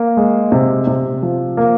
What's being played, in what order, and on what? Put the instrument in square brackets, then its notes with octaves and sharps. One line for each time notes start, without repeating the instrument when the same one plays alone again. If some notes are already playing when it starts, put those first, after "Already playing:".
Already playing: [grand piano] A#3
G#3
C3
C3
F3
A#3